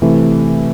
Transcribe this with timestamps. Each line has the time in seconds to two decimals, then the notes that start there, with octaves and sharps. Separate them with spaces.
0.02 C3 E3 A3